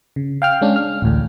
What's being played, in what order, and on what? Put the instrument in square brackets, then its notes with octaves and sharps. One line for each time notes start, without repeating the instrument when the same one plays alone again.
[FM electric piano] C#3
F5 G5 F6
G#3 C#4 D4
F6
A1 D2 A2